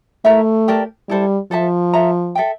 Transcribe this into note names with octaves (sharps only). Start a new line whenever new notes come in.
A3 E4 A#4 E5 A#5
G4 A#4 D5 A5
G3 E4 A4 C5
F3 A4 C5 E5 A5
A4 E5 A#5
A4 E5 G5